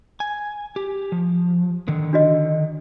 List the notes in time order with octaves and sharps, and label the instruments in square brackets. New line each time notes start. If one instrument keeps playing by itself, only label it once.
[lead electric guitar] G#5
G4
F3
D3 D#3
[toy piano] D4 F#4 D#5